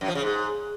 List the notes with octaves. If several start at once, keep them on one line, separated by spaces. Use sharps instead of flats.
F#2
F3
C#3
G#2